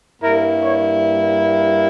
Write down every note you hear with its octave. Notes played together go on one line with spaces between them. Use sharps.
G2 G3 A#3 E4 A#4
C#5